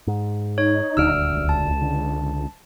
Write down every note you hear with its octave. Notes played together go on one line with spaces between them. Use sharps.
G#2
D#4 C#5
D#1 D2 D4 E6 F6 D7
C#2
A5
D3